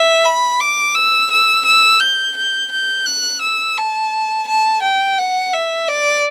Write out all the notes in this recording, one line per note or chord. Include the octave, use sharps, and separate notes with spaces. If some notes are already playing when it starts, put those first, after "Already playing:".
Already playing: E5
B5
D6
E6
E6
E6
G6
G6
G6
F#6
E6
A5
A5
G5
F#5
E5
D5